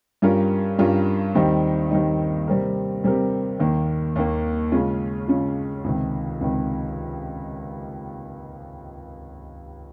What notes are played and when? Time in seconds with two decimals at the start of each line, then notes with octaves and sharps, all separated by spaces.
0.22 G2 G3 C#4 F4 A#4
0.78 G2 G3 C#4 F4 A#4
1.35 D#2 D#3 G3 C4 D#4
1.91 D#2 D#3 G3 C4 D#4
2.47 C3 G3 C4 G4 A#4
3.04 C3 G3 C4 G4 A#4
3.59 D#2 D#3 A#3
4.16 D#2 D#3 A#3
4.72 C#3 G#3 C#4 F4
5.28 C#3 G#3 C#4 F4
5.84 C#2 C3 D#3
6.41 C#2 C3 D#3